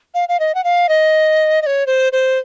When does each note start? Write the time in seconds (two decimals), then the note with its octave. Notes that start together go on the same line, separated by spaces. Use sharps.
0.14 F5
0.29 F5
0.40 D#5
0.55 F#5
0.64 F5
0.89 D#5
1.62 D#5
1.66 C#5
1.87 C5
2.12 C5